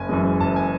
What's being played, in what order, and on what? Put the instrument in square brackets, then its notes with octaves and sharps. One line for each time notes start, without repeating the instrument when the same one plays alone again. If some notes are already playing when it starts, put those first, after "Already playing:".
Already playing: [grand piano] F#1 G#5
F#2 E3 G#3
F#1 A5
G#5